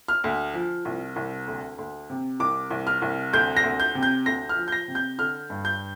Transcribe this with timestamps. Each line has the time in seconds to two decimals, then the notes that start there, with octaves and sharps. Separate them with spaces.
0.08 F6
0.24 D2
0.54 F3
0.85 C2
1.16 C2
1.47 D2
1.78 D2
2.10 C3
2.40 C2 D6
2.71 C2
2.87 F6
3.02 C2
3.33 D2 G6
3.57 A#6
3.63 D2
3.80 G6
3.95 C3
4.03 G6
4.26 D2 A#6
4.49 F6
4.57 F3
4.68 G6
4.72 A#6
4.88 C3
4.95 G6
5.18 D3 F6
5.50 G2
5.65 G6